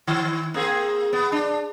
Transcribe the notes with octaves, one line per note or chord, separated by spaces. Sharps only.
D#3
A#3 C4 G#4
B3
D4